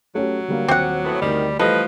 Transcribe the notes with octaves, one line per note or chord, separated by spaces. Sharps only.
F#3 A3 C#4 G4
D3 G3 A#3
D#1 C4 F#5 D6
A2 A3 B3
D2 D#3 G3
E3 F3 G3 A3 A4 B4 D#5